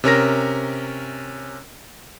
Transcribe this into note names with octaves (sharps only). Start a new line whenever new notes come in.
C3 C#4 A#4 A#6